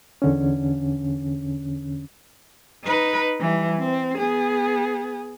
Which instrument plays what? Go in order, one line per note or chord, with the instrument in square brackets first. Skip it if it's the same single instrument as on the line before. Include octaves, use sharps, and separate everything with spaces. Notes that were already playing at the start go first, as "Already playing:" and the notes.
[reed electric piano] E2 D3 C#4
[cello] D#4 B4
E3 G3
C4
B3 G#4